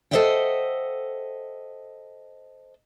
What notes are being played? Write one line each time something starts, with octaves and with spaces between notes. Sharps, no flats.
A4 C5 D#5 E5 F#5 G5